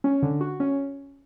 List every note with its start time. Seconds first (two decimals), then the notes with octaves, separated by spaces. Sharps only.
0.04 C#4
0.23 D3
0.41 F#4
0.60 C#4